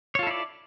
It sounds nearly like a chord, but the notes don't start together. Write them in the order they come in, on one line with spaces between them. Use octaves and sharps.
C#5 F4 A4 E4 D5